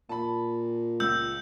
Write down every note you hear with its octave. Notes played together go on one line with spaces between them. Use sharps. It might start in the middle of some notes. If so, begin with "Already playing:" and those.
A#2 A5 B5
C#2 E6 G6